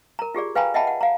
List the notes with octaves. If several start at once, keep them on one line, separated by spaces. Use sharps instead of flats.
A#4 A#5
F4 G4 G#4 D5
B4 F5 G5 G#5 A#5 B5
D#5 E5 F#5 G5 A5 B5
F#5
F5 A#5